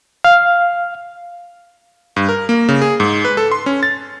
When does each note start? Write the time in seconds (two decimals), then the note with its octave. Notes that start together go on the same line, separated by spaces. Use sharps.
0.24 F5
2.16 G2
2.29 A#4
2.49 A#3
2.68 C#3
2.81 G#4
3.00 G#2
3.25 B4
3.37 A4
3.52 C6
3.66 C#4
3.83 A6